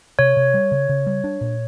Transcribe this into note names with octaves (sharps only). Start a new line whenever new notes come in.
C3 C#5
C3
G3
C#3
C#3
G3
D4
A#2